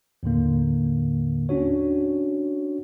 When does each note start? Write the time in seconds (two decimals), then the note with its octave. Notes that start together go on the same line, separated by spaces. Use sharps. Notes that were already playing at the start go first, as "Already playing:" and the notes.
0.23 D#2 A2 D3 A#3
1.49 C#4 D4 F#4 C#5